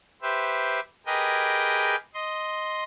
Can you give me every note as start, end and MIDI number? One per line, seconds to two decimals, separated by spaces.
0.22 0.80 67
0.22 0.80 71
0.22 0.80 72
0.22 0.80 76
1.06 1.96 67
1.06 1.96 68
1.06 1.96 70
1.06 1.96 71
1.06 1.96 75
1.06 1.96 79
2.14 2.84 75
2.14 2.84 84